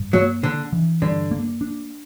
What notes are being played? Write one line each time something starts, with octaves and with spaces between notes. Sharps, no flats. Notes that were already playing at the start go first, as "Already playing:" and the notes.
Already playing: G2
F#3 A#3
D3 D4
E3
G2 D3
A#3
D4